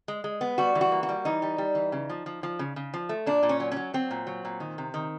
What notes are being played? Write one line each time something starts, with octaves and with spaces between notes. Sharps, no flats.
G#3
G#3
B3
G3 F#4
E3
F#4
A#3
F#4
G3
E3 D#4
G3
G3
E3
C#3
F3
F3
F3
C#3
C#3
F3
A3
A#2 D4
A#2
C#4
F#3
F#3 C#4
F#3 C4
A#2
F#3
A#2
D#3
C3
D#3